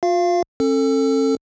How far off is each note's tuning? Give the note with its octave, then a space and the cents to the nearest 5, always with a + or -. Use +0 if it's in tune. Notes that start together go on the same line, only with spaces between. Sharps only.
F4 +35 F5 -20
C#4 -45 A4 +20